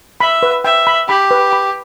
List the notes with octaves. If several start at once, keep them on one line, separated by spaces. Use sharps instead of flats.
E5 B5
B4
E5 G5
B5
G4 B5
B4
B5